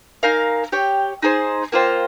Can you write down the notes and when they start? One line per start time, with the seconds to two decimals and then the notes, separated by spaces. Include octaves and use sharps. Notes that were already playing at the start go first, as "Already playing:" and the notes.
0.23 D#4 A#4 F5 G#5
0.72 G4 C#5 G5
1.22 D#4 G#4 C5
1.72 A#3 F4 C5 G5